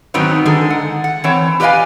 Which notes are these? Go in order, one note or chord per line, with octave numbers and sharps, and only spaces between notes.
G#2 D#3 F#3 B3 C4 D#4
D3 D#3 G#3 G#4 A4
F#5
F#5
E3 C4 C#5
G4 B4 D5 D#5 F5 G#5